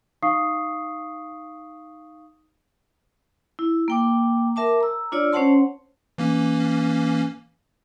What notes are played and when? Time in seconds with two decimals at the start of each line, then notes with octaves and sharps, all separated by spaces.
0.22 D#4 F5 C#6 D#6 C7
3.59 E4
3.88 A#3 G5 D6
4.56 A#4 E5 A5 D6
4.80 A#5 E6
5.12 D4 F4 C#5 D5 E6
5.33 C#4 C5 C#5 F#5 A5 C6
6.18 E3 A#3 C#4